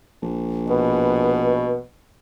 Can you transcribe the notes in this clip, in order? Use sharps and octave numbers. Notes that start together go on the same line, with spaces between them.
A#1
B2 B4